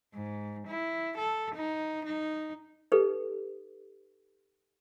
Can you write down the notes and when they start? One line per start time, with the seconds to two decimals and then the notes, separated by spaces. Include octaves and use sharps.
0.14 G#2
0.68 E4
1.18 A4
1.55 D#4
2.05 D#4
2.92 D#4 G4 A4 B4